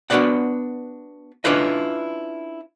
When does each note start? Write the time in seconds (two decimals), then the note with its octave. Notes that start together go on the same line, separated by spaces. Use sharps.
0.10 B3 D4 F#4 B4 D5 F#5
1.44 C#4 D4 E4 F4 B4 D#5